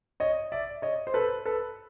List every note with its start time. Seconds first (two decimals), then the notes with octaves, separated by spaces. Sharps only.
0.20 C#5 D#5
0.52 D5 E5
0.82 C#5 D#5
1.07 C5
1.14 A4 B4
1.46 A4 B4